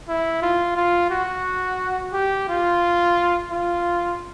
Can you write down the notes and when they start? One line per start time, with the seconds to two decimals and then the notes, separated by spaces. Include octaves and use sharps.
0.08 E4
0.42 F4
0.76 F4
1.10 F#4
2.13 G4
2.49 F4
3.51 F4